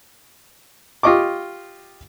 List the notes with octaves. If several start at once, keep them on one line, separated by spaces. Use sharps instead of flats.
F4 G4 D#5 C#6 D6